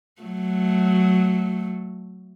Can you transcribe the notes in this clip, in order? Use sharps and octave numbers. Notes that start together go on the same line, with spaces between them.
F#3 A3